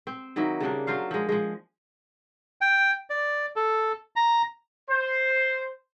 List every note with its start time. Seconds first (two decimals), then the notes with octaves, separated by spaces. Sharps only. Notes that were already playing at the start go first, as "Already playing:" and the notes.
0.07 C4
0.36 D#3 F#3 A#3 E4
0.60 C#3 G3 A#3 D4
0.87 F#3 F4 C5 F5
1.11 F3 G#3
1.29 F3 G#3
2.61 G5
3.10 D5
3.56 A4
4.16 A#5
4.90 C5